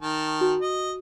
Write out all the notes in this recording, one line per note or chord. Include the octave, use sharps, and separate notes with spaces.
D#3 A5
F#4
D#5